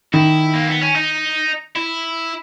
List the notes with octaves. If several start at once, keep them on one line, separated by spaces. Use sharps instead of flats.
D#3 E4
A#3
B3
C#4
D#4
E4